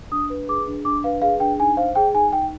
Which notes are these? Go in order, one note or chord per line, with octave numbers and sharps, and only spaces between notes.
D4 D#6
B4
G#4 D6
D4
D4 D6
B4 F5
G#4 F5
D4 G5
D#4 G#5
C5 F5
G#4 G5
D#4 G#5
D#4 G5